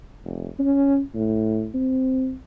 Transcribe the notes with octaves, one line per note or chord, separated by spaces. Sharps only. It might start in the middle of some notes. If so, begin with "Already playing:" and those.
F1
C#4
A2
C4